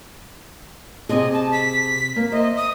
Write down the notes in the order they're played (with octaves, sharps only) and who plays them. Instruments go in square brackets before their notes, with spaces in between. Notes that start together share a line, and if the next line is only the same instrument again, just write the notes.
[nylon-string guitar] C3 G#4 [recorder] D#5
[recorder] A5
B6
[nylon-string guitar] A#3
[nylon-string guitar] C5 E5 [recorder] D#5
[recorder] D#6